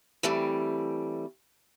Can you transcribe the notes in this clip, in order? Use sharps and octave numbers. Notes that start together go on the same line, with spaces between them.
E3 G3 A3 C4